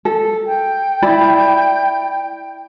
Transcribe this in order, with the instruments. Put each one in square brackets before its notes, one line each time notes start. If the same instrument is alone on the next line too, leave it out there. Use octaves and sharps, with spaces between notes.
[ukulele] A4
[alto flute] G5
[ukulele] E4 D5 B5